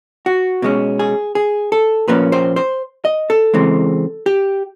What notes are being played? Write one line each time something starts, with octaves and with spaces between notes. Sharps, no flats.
F#4
B2 G#3 C#4
G#4
G#4
A4
A#2 F3 A#3 C#4 B4
C5
C5
D#5
A4
C#3 E3 G#3 C4
G4